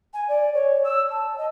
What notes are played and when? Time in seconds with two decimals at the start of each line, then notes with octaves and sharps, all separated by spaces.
0.13 G#5
0.28 D5
0.53 C#5
0.84 E6
1.10 A5
1.38 D#5